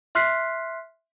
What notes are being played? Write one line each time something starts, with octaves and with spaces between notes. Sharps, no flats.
E5 C6 F6 F#6 B6 C7